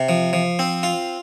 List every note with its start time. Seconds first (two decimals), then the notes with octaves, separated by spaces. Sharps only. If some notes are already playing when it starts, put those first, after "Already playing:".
Already playing: C3
0.09 F3
0.33 F3
0.59 C4
0.83 F4